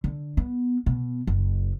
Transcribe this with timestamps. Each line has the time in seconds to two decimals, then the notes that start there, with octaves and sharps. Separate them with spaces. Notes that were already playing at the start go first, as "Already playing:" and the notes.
0.04 D3
0.37 B3
0.86 B2
1.27 F#1